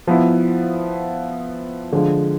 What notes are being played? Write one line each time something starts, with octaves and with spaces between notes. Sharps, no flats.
F3 B3 E4
D3 F3 G#3